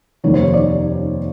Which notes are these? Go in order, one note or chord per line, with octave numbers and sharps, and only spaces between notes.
F1 D#2 D#3 G3 A#3 C#5
C5
C#5
D5